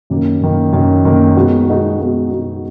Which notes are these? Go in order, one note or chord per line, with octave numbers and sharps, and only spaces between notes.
F#2 D#3 A#3
F#2 D#3 A#3
F#2 D#3 A#3
F#2 D#3 A#3
B2 G#3 B3 D#4 F#4
B2 G#3 B3 D#4 F#4
B2 G#3 B3 D#4 F#4
B2 G#3 B3 D#4 F#4